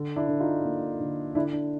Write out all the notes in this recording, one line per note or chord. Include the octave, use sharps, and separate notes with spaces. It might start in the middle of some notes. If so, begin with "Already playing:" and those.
Already playing: D3
D4 E4
D3
D#4 F4
A#3
D3
D3 D4 E4
D4